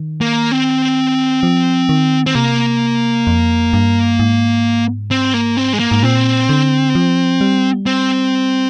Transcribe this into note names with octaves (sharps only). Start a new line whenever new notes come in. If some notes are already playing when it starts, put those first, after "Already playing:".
Already playing: D#3
A#3
C4
F3
D#3
C4
C3 A#3
F2
G2
G#2
C4
A#3
C4
G#3
A#3
G#2
A#2 C4
D3
F3
G3
C4